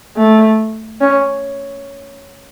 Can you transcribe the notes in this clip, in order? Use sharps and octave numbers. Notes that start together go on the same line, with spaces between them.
A3
C#4